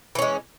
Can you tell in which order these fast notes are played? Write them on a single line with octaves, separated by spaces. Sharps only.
E3 C#4 G#3